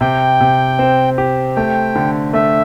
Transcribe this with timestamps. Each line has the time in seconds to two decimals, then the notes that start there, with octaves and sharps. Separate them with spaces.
0.01 C3 G5
0.40 C3
0.79 C4
1.18 G4
1.56 A3 G5
1.95 D3
2.33 A3 E5